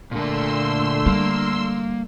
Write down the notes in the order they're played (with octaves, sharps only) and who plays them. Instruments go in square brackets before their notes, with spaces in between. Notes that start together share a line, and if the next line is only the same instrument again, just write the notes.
[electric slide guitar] A#2 A#4 [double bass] D3 A3 [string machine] C6 E6
[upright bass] G3 [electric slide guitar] A#3